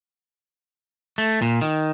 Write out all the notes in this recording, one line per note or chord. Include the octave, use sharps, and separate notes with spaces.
A3
A#2
D#3